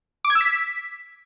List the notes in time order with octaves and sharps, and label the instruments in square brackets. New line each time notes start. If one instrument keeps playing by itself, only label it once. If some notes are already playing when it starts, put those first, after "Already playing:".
[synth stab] D6
G#6
E6
B6